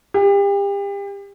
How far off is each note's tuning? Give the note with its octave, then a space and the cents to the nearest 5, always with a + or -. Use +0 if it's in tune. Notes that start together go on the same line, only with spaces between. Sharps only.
G4 +35